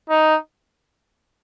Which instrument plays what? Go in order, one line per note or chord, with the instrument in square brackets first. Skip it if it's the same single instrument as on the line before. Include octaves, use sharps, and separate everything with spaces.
[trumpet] D#4